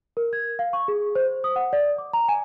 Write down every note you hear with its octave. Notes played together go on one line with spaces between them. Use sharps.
A#4
G#6
F5
C#6
G#4
C5
D#6
F#5
D5
D6
A#5
G#5